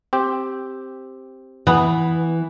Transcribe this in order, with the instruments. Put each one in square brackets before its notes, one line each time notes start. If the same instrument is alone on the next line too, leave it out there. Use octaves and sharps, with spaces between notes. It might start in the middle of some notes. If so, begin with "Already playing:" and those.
[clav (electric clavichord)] C4 G4
[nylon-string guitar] E3 [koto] B3